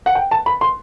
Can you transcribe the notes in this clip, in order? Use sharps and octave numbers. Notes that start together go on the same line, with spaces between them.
F#5
G5
A5
B5
C6